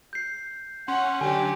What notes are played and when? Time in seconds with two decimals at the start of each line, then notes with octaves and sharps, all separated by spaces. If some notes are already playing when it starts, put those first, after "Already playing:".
0.13 G6 C7
0.88 C#4 F#5 C6
1.21 D3 F#3 G4 G#5